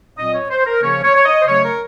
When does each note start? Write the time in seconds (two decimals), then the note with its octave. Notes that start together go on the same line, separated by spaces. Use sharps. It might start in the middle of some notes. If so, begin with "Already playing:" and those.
0.17 A#2 F#3 C4 D#5
0.33 C#5
0.49 C5
0.66 A#4
0.82 C#3 F3 A#3 C#4 C#5
1.04 C#5
1.15 C#5
1.25 D#5
1.41 C5
1.47 C#3 F#3 A3 C#4 C#5
1.63 A#4